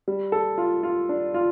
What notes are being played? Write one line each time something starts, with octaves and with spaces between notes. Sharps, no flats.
G3
A4
F4
F4
D4
F4